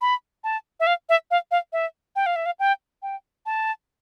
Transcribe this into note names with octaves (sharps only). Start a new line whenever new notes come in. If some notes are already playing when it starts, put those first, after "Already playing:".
B5
A5
E5
F5
E5
F5
F5
E5
G5
F5
E5
F5
G5
G5
A5